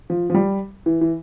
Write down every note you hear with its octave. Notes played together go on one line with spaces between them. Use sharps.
F3
F3
G3
E3
E3